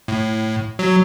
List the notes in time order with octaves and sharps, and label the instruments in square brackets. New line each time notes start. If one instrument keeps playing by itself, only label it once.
[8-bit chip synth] A2
F#3